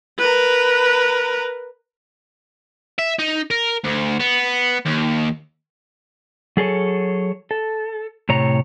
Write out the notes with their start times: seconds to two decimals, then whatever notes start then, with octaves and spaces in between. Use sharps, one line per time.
0.18 A#4 B4
2.98 E5
3.19 D#4
3.51 A#4
3.84 D2
4.20 B3
4.85 D#2
6.57 F#3 G#4 A4 C#5
7.51 A4
8.29 A2 C3 C#5 A#5